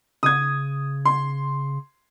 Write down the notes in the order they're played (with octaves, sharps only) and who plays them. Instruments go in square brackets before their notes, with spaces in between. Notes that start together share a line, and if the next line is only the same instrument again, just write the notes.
[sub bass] C#3 [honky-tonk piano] D#6 G#6
[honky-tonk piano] C6